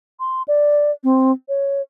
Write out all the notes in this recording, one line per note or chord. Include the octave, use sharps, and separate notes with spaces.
C6
D5
C4
C#5